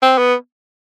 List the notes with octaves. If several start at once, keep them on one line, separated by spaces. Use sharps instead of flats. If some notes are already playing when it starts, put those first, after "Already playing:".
C4
B3